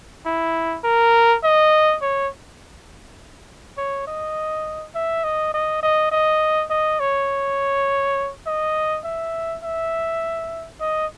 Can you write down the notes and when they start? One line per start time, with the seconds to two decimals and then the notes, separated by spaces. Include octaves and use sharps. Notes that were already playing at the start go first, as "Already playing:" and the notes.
0.26 E4
0.84 A#4
1.44 D#5
2.02 C#5
3.78 C#5
4.07 D#5
4.95 E5
5.24 D#5
5.54 D#5
5.83 D#5
6.12 D#5
6.70 D#5
7.00 C#5
8.47 D#5
9.05 E5
9.63 E5
10.80 D#5